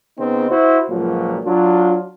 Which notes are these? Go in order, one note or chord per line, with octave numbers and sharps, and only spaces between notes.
C#3 B3 C4 D#4
E4 F#4 C5
C#2 A#2 F3 F#3
F#3 D4 F4